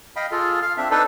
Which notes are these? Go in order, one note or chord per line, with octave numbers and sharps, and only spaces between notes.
D#5 F5 G5 B5
F4 G#4 A4 F6
F5 F6
C4 D4 E5
D4 D#4 A4 B4